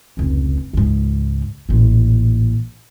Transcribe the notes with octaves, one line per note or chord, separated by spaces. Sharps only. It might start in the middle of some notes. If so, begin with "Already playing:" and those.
F1 C#2
C#2 G#2
A1 A#2